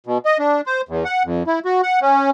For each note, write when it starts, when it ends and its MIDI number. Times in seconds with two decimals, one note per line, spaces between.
0.06 0.18 47
0.25 0.37 75
0.39 0.61 62
0.66 0.81 72
0.89 1.04 40
1.05 1.23 78
1.25 1.43 41
1.47 1.59 64
1.65 1.81 66
1.83 1.99 78
2.02 2.30 61